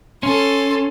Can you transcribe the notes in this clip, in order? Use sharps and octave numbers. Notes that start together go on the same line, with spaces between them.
C#4 A4 C6